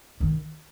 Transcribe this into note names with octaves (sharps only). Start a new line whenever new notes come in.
D#3